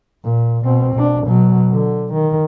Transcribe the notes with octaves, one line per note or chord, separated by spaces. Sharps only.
A#2
B2 C4
B2 D4
B2 F#3
D3
D#3